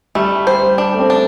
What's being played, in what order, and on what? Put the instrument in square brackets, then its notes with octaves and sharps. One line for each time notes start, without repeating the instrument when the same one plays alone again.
[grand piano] G3 [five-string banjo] A3
[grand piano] G3 [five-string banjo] C5
[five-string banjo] D4
[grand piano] A3
C4
[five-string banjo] D4